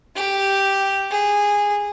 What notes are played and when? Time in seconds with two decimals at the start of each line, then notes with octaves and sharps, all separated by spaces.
0.16 G4
1.11 G#4